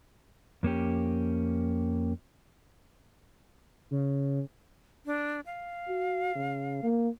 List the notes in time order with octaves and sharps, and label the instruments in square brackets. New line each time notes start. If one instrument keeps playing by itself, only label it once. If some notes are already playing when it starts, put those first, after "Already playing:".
[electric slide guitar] F2 A#3 C#4 G4
[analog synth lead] C#3
[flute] D4
F5
[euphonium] F#4
C#3
A#3